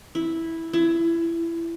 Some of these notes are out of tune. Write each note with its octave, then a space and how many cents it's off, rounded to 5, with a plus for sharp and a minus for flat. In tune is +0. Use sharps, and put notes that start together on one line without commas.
E4 -5
E4 +25